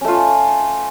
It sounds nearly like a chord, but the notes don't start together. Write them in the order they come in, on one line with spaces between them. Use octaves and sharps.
C#4 A3 F4